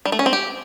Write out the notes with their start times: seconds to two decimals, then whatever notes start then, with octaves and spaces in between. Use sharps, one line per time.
0.05 G3
0.12 A3
0.19 C#4
0.26 C4
0.33 G4